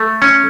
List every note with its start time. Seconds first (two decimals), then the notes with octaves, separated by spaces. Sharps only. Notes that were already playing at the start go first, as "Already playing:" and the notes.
Already playing: A3
0.22 C#4